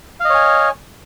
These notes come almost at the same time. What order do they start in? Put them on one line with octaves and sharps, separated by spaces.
F5 D#5 C#5 G#5